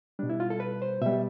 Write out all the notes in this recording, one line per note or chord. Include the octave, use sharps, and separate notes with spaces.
B2 G3 D4
E4
F4
A4
B4
C5
B2 G3 E5